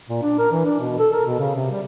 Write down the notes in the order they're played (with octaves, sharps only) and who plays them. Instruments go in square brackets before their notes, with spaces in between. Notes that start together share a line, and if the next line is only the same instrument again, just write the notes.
[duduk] A#2
D4
A#4
E3
D4
B2
A4
A#4
B2
C#3
C3
G3